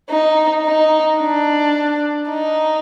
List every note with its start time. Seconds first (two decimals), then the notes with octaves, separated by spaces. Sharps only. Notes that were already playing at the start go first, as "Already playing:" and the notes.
0.10 D#4
0.65 D#4
1.20 D4
2.30 D#4